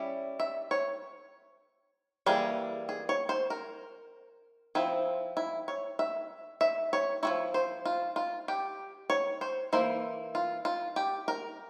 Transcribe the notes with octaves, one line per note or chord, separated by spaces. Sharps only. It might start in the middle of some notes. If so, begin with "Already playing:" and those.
Already playing: G3 C#4 E4
E5
C#5
E3 G3 A#3 G#4
G#4
C#5
C5
A#4
F3 C4 E4
E4
C#5
E5
E5
C#5
F3 C4 E4 C#5
C5
F4
F4
G4
C#5
C5
E3 A#3 E4 C5
F4
F4
G4
A#4